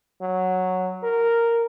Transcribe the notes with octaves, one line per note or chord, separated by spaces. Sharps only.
F#3
A#4